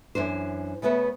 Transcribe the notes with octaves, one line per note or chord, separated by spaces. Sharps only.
F#2 E3 D4 C5
C#3 A3 B3 B4 E5